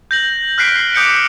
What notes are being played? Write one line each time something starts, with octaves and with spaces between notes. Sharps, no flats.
G6 A#6 F#7
F6 F#6 B6 C7 D7
D6 D#6 G6 C#7 D7